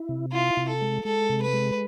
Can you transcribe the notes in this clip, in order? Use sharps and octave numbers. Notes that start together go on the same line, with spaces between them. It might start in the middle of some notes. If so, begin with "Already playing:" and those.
Already playing: E4
C3
E4 F4
C3
A4
G#3
G#3 A4
C3
B4
G#3